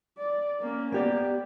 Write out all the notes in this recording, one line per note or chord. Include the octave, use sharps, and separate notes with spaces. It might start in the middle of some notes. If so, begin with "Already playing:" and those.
D5
A#3 C#4
A#3 B3 G4 D5